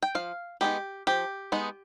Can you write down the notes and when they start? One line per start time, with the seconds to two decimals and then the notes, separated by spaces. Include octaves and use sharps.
0.03 G5
0.15 F3 F5
0.61 G#3 B3 D#4 G4
1.07 F3 G4
1.52 G#3 B3 D#4